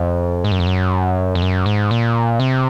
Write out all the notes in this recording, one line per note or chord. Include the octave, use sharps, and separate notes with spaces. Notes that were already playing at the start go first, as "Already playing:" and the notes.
Already playing: F2
G#2
F#2
F2
F#2
F2
F#2
G#2
A#2
C3